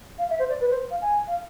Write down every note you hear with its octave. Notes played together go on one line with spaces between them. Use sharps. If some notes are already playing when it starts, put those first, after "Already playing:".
F5
E5
C5
D5
B4
C5
F5
G#5
F5